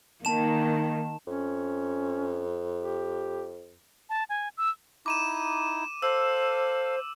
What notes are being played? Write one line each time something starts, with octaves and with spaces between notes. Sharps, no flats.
D#3 A#3 A5 E7
F2 C#4
G4
A5
G#5
E6
D#4 E4 D6 D#7 E7
A4 C5 F5 E6